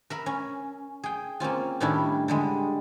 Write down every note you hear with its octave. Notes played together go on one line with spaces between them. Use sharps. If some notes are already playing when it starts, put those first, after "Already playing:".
A#4 E5 B5
C#4
G#4 G5
A#3 C4 C#4 F4
A2 D#3 G3 C#4 D4 E4
D3 G3 G#3